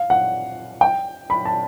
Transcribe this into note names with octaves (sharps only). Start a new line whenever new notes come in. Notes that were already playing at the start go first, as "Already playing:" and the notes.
Already playing: F5
F#5
G5
B5
A5